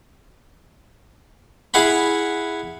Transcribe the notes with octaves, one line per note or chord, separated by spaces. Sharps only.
E4 G#4 F5 F#5 B5